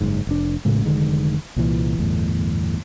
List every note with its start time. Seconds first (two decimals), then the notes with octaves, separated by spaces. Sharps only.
0.01 F#1 G#2
0.27 F1 D4
0.65 A1 A2 C#3 G#3
0.85 F1 D3 D#3 G#3
1.56 C2 A#2 E3
1.99 G1 E2 A2